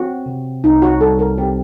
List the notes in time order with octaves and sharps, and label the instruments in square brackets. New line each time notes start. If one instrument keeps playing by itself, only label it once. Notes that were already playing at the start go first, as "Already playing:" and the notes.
Already playing: [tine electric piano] C4 [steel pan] F#4
[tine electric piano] C3
[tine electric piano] C2 [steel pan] D#4
[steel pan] F#4
[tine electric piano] G3 [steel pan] A4
[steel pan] A#4
[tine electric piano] C4 [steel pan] G4